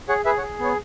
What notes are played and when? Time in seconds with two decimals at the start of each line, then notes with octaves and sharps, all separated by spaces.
0.08 G#4 C#5 F#5
0.25 G#4 B4 E5
0.38 C#5 F#5
0.42 G#4
0.59 B3 C#5